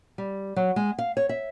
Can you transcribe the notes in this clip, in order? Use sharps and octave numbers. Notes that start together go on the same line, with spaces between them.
G3
F#3
G#3
F5
C#5
E5